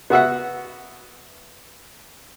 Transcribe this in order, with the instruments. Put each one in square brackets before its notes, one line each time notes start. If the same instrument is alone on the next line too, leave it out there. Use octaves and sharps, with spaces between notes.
[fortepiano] B3 F#4 E5 F#5